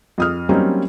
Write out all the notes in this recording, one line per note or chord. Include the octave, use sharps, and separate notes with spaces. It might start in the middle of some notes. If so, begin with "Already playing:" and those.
F2 D#6 F6
F#3 G3 A#3 C4 C#4 D#4